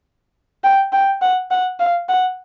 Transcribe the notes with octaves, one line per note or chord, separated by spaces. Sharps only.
G5
G5
F#5
F#5
F5
F#5